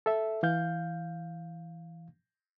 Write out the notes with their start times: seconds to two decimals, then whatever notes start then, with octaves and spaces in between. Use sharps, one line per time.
0.06 A4 E5
0.43 E3 F5 G6